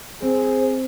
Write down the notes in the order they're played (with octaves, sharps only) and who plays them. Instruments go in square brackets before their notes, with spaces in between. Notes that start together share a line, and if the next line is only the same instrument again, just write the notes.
[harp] C4 [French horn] G#4 [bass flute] C5